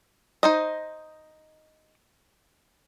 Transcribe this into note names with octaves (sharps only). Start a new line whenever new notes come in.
D#4 C5 D#5